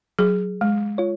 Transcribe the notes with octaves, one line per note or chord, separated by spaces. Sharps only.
F#3 G#4
G#3
F4 C#5